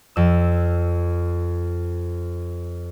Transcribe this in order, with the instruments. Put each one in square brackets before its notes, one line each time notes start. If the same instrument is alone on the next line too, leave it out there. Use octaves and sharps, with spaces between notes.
[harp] F2 E6